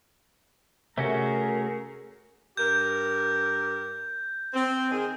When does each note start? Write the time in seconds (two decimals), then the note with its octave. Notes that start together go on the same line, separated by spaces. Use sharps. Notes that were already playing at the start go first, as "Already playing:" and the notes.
0.98 C3 A3 C#4 F#4 G#4 A#4
2.57 G2 G4 A#4 G6
4.54 C4
4.90 D#3 G#4